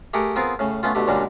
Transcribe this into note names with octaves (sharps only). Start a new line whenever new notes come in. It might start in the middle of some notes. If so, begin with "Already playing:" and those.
A3 G4 G#4 A#4 F#5 G5
B3 C4 F4 G#4 A#4 C5
A2 C#3
A3 B3 C#4 F4
B2 D3 A3 G4
C#2 F#2 A#2 D3 G3 A#3